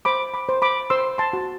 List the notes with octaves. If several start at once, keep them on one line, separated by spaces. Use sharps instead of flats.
C5 B5 D6
B5 D6
C5
B5 D6
C5 C6 E6
A5 C6
F#4